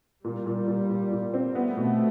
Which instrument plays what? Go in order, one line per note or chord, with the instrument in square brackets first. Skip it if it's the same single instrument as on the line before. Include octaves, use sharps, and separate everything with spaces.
[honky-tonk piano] A#2 [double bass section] G3
[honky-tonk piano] A#2
A#2
A#2
A#2
C4
[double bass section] A3 [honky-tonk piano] B3
[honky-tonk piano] B2